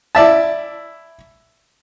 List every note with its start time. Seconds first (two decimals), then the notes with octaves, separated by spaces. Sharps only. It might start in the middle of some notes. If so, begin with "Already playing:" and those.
0.15 E4 D5 E5 A5